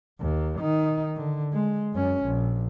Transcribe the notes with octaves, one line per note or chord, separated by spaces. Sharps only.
D#2
D#3 D#4
D3
G#3
F#2 C#4
A#1